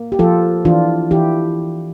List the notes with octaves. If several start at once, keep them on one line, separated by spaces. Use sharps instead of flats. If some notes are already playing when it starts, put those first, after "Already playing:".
Already playing: A#3
G4
F3 F4 A4
E3 D4 F4
E3 E4 G4